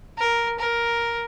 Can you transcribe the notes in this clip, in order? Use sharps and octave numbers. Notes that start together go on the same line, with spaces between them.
A#4
A#4